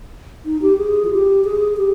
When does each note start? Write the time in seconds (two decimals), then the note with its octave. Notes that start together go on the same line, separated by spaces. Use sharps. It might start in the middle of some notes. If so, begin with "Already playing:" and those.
0.46 D#4
0.62 G4
0.78 G#4
1.05 F4
1.11 G4
1.45 G#4
1.77 G4